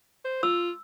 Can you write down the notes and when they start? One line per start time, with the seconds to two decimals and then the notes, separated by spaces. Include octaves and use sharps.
0.25 C5
0.43 F4 E6